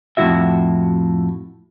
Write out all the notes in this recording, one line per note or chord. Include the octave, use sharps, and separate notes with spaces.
F2 A2 F#3 E4 F#4 E5